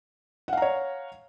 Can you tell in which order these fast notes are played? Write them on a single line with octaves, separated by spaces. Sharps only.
F#5 F5 A#5 C#5